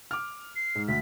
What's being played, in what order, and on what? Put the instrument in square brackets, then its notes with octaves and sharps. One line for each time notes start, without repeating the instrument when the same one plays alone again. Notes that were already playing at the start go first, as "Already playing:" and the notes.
[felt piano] D6 F6
[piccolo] C7
[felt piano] G#2
[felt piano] D2 [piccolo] B6